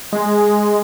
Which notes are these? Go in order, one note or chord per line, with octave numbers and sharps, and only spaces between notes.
G#3